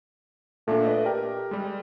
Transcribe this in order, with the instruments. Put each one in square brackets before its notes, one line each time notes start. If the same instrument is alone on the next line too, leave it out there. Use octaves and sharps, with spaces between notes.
[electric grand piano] A#2 A#3 D4 [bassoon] A3
[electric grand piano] B4 D5 D#5
[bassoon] G4 [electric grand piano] A#4
[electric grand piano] G3 G#3